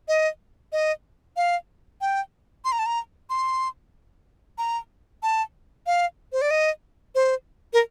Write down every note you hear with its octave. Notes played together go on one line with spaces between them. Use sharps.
D#5
D#5
F5
G5
C6
A#5
A5
A#5
C6
A#5
A5
F5
C5
D5
D#5
C5
A#4